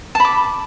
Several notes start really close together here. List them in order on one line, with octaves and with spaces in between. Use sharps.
A5 B5 D6